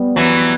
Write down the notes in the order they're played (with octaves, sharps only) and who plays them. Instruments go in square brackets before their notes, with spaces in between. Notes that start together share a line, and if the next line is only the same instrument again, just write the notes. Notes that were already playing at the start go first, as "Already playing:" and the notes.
Already playing: [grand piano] G3 B3
[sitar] E3 F#3 [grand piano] B3